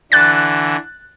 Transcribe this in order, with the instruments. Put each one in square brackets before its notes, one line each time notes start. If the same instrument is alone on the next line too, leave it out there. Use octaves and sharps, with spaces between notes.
[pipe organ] D3 E3 [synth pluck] F#6 A6